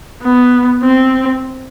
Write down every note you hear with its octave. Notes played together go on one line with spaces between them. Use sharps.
B3
C4